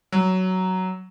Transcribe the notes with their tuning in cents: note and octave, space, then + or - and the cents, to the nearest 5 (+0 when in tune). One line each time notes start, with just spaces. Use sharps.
F#3 +10